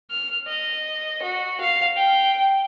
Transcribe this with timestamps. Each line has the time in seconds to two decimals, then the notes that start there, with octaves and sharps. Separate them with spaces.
0.11 F6
0.47 D#5
1.22 F#4
1.60 F5
1.96 G5